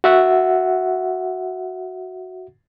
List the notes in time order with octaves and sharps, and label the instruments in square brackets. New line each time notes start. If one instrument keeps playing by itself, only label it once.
[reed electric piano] F#4 E5 F#5